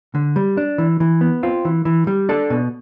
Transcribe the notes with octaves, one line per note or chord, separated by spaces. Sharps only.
D3
G3
D4
E3
E3
B3
C4 F4
E3
E3
G3
D4 A4
B2